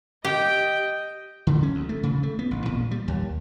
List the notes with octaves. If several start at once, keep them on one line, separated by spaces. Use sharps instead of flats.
G4 D#5 G5
D3
C#4
D2
A3
C#3
A3
B3
A1
A#2
G3
D#2